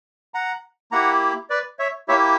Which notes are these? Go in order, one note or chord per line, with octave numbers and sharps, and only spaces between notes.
F#5 A#5
A#3 E4 G4 F#5 A#5
B4 D5
C#5 E5
A#3 E4 G4 C#5 E5